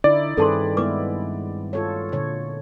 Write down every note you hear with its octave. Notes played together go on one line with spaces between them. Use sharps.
D3 D#4 E4 D5
G2 D#3 C4 G#4 A4 B4 A5 C6
G#3 B3 E4 B4 D6
F4 A4 C#5
A#2 D3 C#5